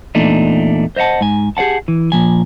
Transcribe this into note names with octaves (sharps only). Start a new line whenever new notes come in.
E2 A#2 A3 D4 D#4
C5 D#5 E5 F#5 A5
G#2 G#5
G4 G#4 C#5 F#5 A5
E3
A#2 F3 G#5